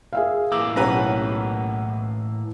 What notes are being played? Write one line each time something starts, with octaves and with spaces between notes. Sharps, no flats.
G#4 E5 F5
A2 E3 A#3 D6 E6
B1 C#4 G4 B4 C#5 A#5